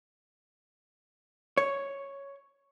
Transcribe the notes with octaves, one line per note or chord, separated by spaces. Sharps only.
C#5